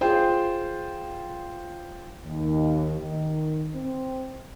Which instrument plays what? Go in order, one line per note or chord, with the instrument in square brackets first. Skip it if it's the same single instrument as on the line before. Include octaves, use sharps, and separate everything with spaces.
[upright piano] F4 G#4 C5 G5
[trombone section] D#2
D#3
C4